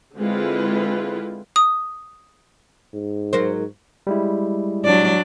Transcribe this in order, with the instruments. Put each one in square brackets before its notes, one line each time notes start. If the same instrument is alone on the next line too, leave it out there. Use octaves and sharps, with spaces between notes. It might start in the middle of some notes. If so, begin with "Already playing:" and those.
[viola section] D3 G#3 C4 E4 F4 B4
[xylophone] D#6
[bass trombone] G#2
[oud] F#3 A#4 C5
[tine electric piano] G3 G#3 E4
[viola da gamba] F#3 D4 D5